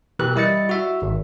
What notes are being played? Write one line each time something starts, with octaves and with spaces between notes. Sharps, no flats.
B2 E3 G4 A#4 F#6
G3 E4 D#5 A6 C#7
F#4 E5
G#1